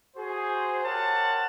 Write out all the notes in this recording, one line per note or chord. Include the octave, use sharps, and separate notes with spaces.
F#4 G#4 C5
G4 A#4 C5 C#5 F#5 A5